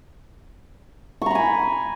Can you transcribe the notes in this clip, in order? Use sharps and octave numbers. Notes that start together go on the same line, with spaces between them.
G#5 A#5 B5 C#6